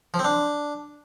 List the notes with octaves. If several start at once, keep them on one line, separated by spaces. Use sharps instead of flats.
F3
C4
D4